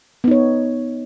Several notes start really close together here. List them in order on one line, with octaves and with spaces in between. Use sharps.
B3 D#4 C#5